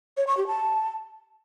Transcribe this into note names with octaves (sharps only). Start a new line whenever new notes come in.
C#5
C#6
G4
A5